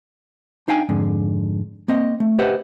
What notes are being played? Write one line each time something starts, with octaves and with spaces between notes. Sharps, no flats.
D4 D#4 F5 G5 G#5
F2 G#2 D3
A#3 C4 D#5
A3
G4 B4 C5 D#5 E5 F#5